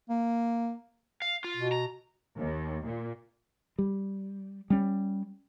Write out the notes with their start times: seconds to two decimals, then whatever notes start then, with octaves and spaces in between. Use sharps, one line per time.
0.09 A#3
1.22 F5
1.44 F4
1.57 B2
1.72 A#5
2.38 D#2
2.85 A#2
3.79 G3
4.70 G3 C#4